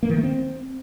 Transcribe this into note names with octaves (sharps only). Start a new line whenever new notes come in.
A#3
D#3
A3
C4